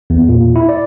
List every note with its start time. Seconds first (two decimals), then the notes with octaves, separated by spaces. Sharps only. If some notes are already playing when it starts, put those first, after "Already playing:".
0.10 E2
0.29 A#2
0.56 E4
0.69 D5